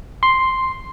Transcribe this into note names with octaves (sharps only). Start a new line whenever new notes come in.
C6